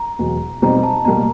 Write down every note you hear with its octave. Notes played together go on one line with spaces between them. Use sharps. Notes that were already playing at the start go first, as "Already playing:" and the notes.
Already playing: A#5
E2 B2 F#3
B2 G3 C4 D#4 A#5
A5
B2 G3 A#3 A#5